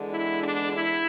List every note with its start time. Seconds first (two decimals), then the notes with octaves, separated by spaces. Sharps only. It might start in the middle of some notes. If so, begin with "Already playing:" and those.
Already playing: E2 D3 G#3
0.10 E4
0.41 D4
0.70 E4